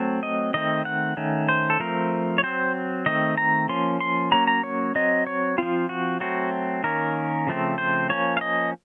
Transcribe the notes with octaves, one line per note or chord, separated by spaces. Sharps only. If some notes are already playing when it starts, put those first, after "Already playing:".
Already playing: F#3 A3 C4
D#5
D#3 A3 C4 D#5
F#5
D#3 A3 C#4
C5
A4
F3 A3 C4 A#4
C#5
F#3 C4 C5
D#3 A3 C4 D#5
A#5
F3 A#3 C#4 C6
C6
F#3 A#3 C#4 A#5
A#5
C#5
F#3 C4 D#5
C#5
F3 C4 F4
F#4
F#3 A3 C4 F#4
D#3 A#3 C#4 A#4
C#3 F3 A3 C4
C5
F3 A#3 C#4 C#5
F5
D#5